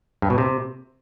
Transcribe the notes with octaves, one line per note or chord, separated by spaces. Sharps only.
G2
B2
C3